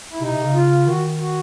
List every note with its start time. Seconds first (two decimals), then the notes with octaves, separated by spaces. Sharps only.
0.10 E4
0.20 C3 D#4
0.32 C3
0.42 C#3
0.53 F4
0.86 D#3 F#4
1.19 F#4